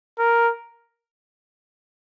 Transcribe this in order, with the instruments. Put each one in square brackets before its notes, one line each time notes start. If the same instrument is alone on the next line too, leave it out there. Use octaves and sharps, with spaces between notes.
[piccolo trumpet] A#4